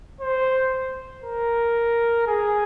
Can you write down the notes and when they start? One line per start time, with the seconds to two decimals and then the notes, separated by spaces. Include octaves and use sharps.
0.21 C5
1.24 A#4
2.27 G#4